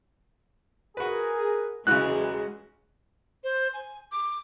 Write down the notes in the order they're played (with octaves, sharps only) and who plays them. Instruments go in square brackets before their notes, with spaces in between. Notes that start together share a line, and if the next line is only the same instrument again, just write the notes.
[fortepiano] F#4 B4 [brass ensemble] G#4 A#4
[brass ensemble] B1 E2 [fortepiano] C#3 E3 [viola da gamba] G#3 [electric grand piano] F#4 F#6
[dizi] C5
G#5
D6